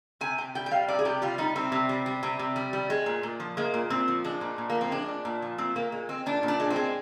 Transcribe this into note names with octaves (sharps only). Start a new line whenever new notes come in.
C3 G#5
C3 G5
G3 G5
G5
G3 F5
C3 D5
G#4
C3 G4
G3 F4
G3 D#4
C3 C4
C3
G3
G3
C3
C3
G3
G3
G#3
A#2
A#2
F3
G#3 A#3
A#2
A#2 C4
F3
G#3 D4
A#2
A#2
A#3
F3
C4
G#3 D4
A#2
A#2
F3
A#2 C4
A#2 A#3
G#3
G#3 C4
A#2 D4
A#2
D4
G#3
C4
G#3